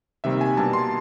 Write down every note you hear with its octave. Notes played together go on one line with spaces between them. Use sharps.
C3 D#3 G3 A#3 E5
G#5
B2 G3 A#3 D4 A5
C6